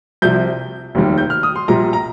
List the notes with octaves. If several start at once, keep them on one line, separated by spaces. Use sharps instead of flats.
C2 C3 F3 G6
F1 D#2 D#3 G3
G6
F6
D#6
C6
A#1 A#2 G3 A#5
A#5